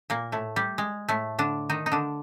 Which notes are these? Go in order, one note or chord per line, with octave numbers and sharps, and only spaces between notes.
A#2 A#3
A2 A3
G3
G#3
A2 A3
D3 D4
D#3 D#4
D#4
D3 D4